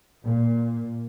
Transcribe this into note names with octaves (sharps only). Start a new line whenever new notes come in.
A#2